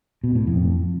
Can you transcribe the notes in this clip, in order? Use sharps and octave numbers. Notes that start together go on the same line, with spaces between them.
B2
A2
F2